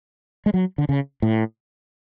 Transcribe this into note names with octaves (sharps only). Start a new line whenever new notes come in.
G#3
F#3
D3
C#3
A2